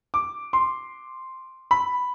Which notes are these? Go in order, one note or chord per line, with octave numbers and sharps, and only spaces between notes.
D6
C6
B5